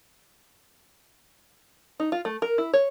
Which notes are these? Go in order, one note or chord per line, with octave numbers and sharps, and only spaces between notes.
D#4
F4
A3
A#4
E4
C#5